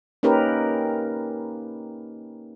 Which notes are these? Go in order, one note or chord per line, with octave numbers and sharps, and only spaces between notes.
A#3 C#4 D#4 G4 A#4 B4